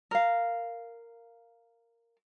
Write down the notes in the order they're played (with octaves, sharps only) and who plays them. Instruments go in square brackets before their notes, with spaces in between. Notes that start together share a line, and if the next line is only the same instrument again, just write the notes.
[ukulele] A#4 F5